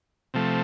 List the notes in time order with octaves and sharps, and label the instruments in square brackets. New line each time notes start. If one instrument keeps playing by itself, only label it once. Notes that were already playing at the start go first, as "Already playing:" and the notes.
[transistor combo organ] C3 F3 A3